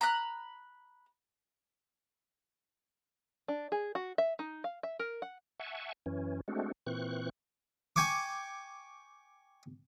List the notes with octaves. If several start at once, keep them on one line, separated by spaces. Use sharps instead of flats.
A#5 B5 F#6
D4
G#4
F#4
E5
D#4
F5
E5
A#4
F#5
E5 F#5 G#5 A5 C#6
F#2 E3 C#4
G#3 A3 C4 D4 F#4
A#2 E3 C4 C#6 F#6
G5 G#5 C#6 D6